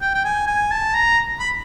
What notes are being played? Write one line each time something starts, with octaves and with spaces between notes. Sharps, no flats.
G5
G5
G#5
G#5
A5
A#5
B5